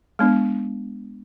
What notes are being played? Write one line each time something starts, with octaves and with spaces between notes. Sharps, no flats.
G#3 B3 D4